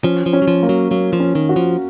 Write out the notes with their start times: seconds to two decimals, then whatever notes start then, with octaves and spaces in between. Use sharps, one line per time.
0.04 F3 C#4
0.26 F3
0.33 C#4
0.42 F#3
0.48 F3
0.63 A#3
0.69 F#3
0.91 F#3 A#3
1.13 F3
1.20 C#4
1.35 D#3
1.49 F#4
1.56 F3